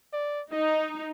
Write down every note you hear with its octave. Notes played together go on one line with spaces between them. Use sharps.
D5
D#4 D#5